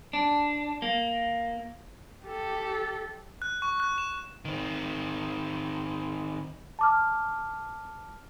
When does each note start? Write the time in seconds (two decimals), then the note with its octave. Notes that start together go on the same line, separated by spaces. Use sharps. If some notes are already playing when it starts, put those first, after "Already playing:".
0.13 D4
0.82 A#3
2.24 G4 A4
3.42 F#6
3.62 C#6
3.80 F#6
3.98 E7
4.45 D#3 C4
6.79 A5 D6 F6